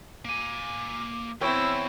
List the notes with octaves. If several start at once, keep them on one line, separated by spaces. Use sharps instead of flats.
A#3 G#5 D6
E2 C4 E4 C#5 G5 E6